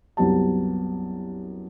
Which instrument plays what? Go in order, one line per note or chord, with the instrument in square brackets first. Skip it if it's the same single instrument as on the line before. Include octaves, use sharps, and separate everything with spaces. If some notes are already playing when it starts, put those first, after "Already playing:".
[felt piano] C2 F#2 B3 G4 A5